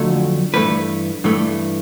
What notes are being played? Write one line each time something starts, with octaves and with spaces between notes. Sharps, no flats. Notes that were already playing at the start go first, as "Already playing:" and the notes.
Already playing: F2 D3 F#3 A3
G2 E3 A3 B4
G2 E3 A3